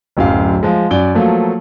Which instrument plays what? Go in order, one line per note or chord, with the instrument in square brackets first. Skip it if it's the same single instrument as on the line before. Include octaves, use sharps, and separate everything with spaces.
[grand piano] D1 F#2 F5
F3 G#3
F#2 D5 G7
F3 F#3 A3 A#3